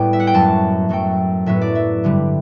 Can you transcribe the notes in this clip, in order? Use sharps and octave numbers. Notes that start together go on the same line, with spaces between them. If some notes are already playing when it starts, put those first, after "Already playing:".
Already playing: A2 G3 B3 D5 G5
E5
F#5
G5
F#2 F#3 A3 A5
F#2 F#3 A3 G5
A2 F#3 B3 E5
D5
E5
G2 D3 G3